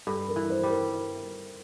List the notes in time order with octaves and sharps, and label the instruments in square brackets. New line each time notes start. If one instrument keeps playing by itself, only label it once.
[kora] G2 [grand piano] A4
[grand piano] A#4
[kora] E3
[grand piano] C5
[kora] G3
[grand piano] A#4